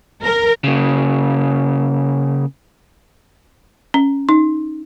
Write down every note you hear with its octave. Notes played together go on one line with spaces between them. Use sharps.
A#4
C#3 A#3
C#4
D#4